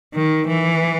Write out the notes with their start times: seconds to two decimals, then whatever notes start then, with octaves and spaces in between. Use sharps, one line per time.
0.15 D#3
0.48 E3